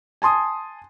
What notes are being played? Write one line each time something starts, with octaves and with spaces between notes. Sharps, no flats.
G#5 A5 C6 D#6